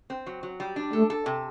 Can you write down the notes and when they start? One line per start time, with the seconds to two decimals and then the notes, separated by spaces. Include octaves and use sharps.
0.10 C4
0.26 F#3
0.43 F#3
0.60 G3
0.76 D4
0.93 A3 A4
1.10 A4
1.26 C3